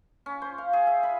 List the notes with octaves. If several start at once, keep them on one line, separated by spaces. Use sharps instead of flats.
C#4
C5
F5
G#4
E5
B5